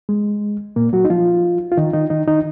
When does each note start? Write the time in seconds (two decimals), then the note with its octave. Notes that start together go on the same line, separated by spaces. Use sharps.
0.09 G#3
0.76 A#2 A#3
0.93 F#3 F#4
1.05 D#4
1.10 F3 F4
1.72 F4
1.77 D#3 D#4
1.93 D#3 D#4
2.10 D#3 D#4
2.28 D#3 D#4